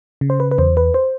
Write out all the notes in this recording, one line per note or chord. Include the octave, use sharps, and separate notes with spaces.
C#3
C5
B4
B4
E2 C5
B4
C5